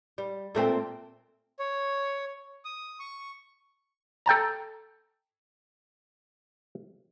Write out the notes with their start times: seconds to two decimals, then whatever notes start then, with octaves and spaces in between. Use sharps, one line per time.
0.18 G3
0.55 A#2 A3 C4
1.59 C#5
2.65 D#6
2.99 C#6
4.26 A4 G5 A5 A#5